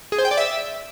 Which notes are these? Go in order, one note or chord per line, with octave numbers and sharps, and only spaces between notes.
G#4
C5
G5
D5
E5